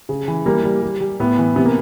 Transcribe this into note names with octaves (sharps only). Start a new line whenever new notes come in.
C#3
E3
G3 A#3
G3
G3
G3
A2 B3
E3
C3 B3
A#3